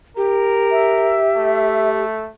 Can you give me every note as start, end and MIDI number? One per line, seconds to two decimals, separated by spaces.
0.17 2.04 67
0.17 1.20 70
0.72 1.89 76
1.37 2.29 57